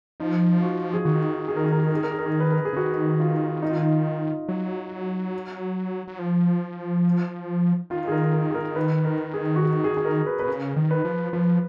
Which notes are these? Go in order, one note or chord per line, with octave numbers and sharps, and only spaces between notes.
F3 D#4
F4
F#4
G#4
D#3 F#4
G#4
A#4
G#4
A#4
G#4
A#4
G#4
A#4
G#4
A#4
G#4
B4
A#4
G#4
C#3
D#3 F#4
F4
D#4
F4
D#4
F#3
F#3
F3
D#3 F4
G#4
A#4
A#4
G#4
A#4
B4
A#4
G#4
F#4
G#4
G#4
G#4
A#4
B4
B2 B4
C#3 A#4
D#3
B4
F3
F3 B4